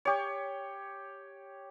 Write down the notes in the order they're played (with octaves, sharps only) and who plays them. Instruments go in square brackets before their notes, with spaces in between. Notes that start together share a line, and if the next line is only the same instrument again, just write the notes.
[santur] G4 C#5